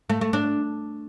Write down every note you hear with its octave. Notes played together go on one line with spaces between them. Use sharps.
A3
A3
D4